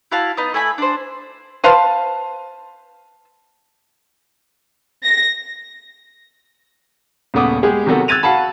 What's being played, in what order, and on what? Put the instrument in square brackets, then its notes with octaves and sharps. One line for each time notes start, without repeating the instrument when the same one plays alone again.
[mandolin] E4 F#4 F5 A5
B3 D#4 D#5
A3 E4 G#5 B5
D4 C5
[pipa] B4 C5 F5 A5
[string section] A#6
[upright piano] D#1 C#3 A3 B3 D6 D#6
G#3 B3 G4 G#4
C3 D#3 F#3 B3 F#4 A4
E6 F#6 G#6 A6 D#7 F7
F#4 F5 F#5 A5 B5